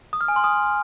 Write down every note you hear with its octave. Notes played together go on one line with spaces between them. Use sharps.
D#6
F6
G#5
C6
D#6